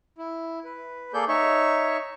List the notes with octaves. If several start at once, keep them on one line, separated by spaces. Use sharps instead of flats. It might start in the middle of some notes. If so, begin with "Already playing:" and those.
E4
B4
A#3 G#4 A4 D5 G6
D#4 C#5 E5 C#6